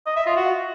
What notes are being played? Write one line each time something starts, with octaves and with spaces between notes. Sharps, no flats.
D#5
E5
F4
F#4